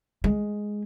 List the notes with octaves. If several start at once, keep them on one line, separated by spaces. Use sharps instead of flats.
G#3